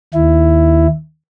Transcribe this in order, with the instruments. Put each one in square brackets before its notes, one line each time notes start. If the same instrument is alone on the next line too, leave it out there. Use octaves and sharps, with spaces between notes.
[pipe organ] D#2 E4